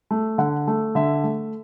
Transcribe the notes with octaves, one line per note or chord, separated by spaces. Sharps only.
A3
D3 F#5
A3
D3 E5
A3